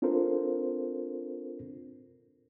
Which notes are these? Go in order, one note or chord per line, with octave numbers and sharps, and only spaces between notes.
C4 D4 F4 A4 A#4 C5